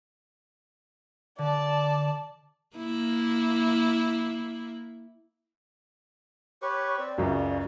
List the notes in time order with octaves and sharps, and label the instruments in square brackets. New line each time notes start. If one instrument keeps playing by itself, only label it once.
[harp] D3 [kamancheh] D5 A5
[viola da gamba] A#3 E4
[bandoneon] G4 B4 C#6 [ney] C#5
[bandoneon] C4 [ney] D5
[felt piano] C#2 F#2 [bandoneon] C#3 [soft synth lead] F#4